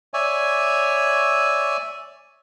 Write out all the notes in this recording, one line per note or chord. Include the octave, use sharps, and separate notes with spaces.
C#5 D5 E5 G#5